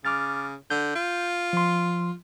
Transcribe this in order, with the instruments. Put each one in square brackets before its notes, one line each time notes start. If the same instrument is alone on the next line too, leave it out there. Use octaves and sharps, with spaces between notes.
[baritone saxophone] C#3 [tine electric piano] D6 F6 A6
[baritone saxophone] D3 [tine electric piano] G6
[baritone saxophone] F4
[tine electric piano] F3 C6